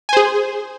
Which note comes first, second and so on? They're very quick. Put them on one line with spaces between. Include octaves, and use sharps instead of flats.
G#5 C5 G#4